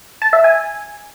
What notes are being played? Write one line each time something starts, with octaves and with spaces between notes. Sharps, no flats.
A5
E5
G#5